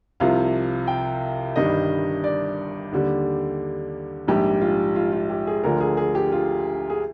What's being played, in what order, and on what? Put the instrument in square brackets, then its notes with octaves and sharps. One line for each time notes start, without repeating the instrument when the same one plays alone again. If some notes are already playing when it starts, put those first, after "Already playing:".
[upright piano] C2 C3 F3 F5
G5
G1 G2 D#3 G3 D#5
D5
D#2 D3 G3
A#1 G#2 G3 G4
F4
F4
F4
G4
G#4
D2 D3 F3 A#4
G#4
G#4
G4
F4
G#4